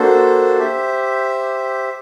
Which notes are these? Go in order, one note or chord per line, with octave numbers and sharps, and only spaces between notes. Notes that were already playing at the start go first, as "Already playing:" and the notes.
Already playing: A#3 D4 F#4 A4 C5
G4 C5 E5